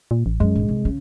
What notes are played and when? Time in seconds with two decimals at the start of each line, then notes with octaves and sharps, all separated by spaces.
0.11 A#2
0.26 A1
0.40 F#2 G#3
0.55 G#1 D3
0.68 C2
0.85 C#3